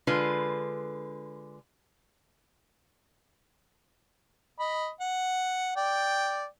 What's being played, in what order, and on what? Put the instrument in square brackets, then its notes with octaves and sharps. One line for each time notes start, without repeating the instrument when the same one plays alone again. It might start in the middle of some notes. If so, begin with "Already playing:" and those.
[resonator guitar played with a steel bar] D3 G#3 F4 B4
[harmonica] D#5 B5
F#5
D5 G5